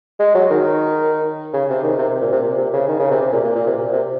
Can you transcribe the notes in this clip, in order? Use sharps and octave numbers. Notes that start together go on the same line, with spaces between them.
G#3
F#3
D#3
C#3
C3
D#3
C3
C3
A#2
C3
A#2
C3
C#3
D#3
C#3
C3
C3
A#2
A#2
A#2
C3
A#2
C3